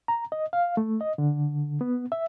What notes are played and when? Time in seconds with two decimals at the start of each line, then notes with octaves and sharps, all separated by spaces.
0.08 A#5
0.32 D#5
0.53 F5
0.77 A3
1.01 D#5
1.18 D3
1.81 B3
2.12 E5